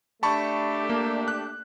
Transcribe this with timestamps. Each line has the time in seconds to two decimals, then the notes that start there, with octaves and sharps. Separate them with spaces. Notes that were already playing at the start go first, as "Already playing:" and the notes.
0.23 A3 D4 G4 A5 B5 C#6
0.89 A#3
1.28 F#6